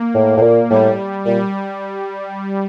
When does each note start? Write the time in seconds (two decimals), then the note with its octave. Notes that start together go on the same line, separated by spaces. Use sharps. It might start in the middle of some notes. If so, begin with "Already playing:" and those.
Already playing: A#3
0.14 A2
0.37 A2
0.41 A#2
0.70 A2 G3
1.25 A#2 G3